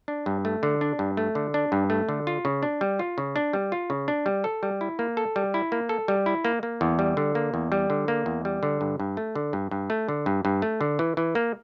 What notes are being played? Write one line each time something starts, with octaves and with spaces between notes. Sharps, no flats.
D4
G2
A3
D3
D4
G2
A3
D3
D4
G2
A3
D3
F4
C#3
D4
G3
F4
C#3
D4
G3
F4
C#3
D4
G3
A4
G3
E4
A#3
A4
G3
E4
A#3
A4
G3
E4
A#3
A#3
E2
G3
D3
A#3
E2
G3
D3
A#3
E2
G3
D3
G2
G2
A3
D3
G2
G2
A3
D3
G2
G2
A3
D3
E3
E3
A#3